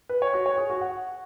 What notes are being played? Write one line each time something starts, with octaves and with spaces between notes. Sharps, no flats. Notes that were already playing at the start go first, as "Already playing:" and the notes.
B4
C#5
F#4
C#5
G#4
F#4
F#5